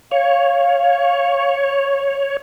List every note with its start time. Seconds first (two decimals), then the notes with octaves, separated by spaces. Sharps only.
0.12 C#5 F5